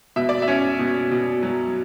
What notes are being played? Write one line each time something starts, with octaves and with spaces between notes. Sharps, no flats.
B2 E5
D5
E5
C#4
B2
B2
F#3